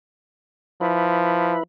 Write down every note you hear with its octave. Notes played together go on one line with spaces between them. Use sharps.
F3 E4 B4